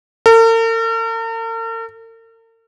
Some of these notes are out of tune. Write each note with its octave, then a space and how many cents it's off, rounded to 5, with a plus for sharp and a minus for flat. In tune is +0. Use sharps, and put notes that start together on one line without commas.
A#4 -45